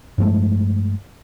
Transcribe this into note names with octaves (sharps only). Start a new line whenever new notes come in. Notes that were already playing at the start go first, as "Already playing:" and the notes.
G2 F3 G#3 A3